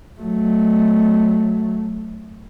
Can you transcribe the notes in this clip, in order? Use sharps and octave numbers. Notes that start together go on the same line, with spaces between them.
F#3 A3